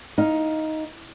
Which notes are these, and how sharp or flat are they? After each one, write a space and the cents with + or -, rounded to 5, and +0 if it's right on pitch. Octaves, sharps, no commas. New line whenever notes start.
D#4 +10 F5 +0